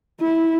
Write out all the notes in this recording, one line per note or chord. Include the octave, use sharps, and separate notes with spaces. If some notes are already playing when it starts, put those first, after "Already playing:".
E4